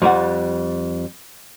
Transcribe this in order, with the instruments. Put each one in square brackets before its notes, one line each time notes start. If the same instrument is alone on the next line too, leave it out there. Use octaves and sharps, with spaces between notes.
[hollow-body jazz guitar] F2 G3 F#5